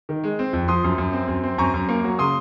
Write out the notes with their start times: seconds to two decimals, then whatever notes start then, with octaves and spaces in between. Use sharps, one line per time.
0.09 D#3
0.24 G#3
0.39 C4
0.53 F2
0.68 F3 C6 D#6
0.84 F#2
0.98 F#2
1.13 C4
1.28 F#2
1.43 C4
1.58 F#2 A#5 C#6
1.74 F#2
1.89 A#3
2.04 F#3
2.19 C#3 C6 D#6